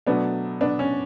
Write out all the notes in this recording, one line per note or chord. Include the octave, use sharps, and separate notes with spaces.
B2 F#3 A3 B3 D4
B3 D4
C#4